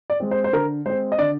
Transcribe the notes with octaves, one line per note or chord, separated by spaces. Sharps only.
D5
G#3 C4
C5
C5
D3 A#4
G#3 C4 C5
D#5
D3 D5